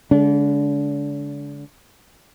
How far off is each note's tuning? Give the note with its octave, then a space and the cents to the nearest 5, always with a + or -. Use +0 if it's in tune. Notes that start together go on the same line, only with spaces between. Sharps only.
D3 -35 G#3 +10 D4 -35